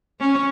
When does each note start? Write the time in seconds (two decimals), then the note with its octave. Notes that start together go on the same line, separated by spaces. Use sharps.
0.20 C#4